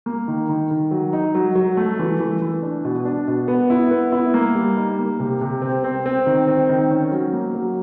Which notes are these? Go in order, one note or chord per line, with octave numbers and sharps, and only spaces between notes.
A#3
D#3
D#3
D#3
F#3
D#4
F#3
F#3
A3
E3
E3
E3
D4
B2
D4
B2
B3
E4
B3
E4
A#3
G3
D#4
A#3
C3
C3
C4
C4
C4
D#3
C4
D#3
C#4
F#3
A#3
F#3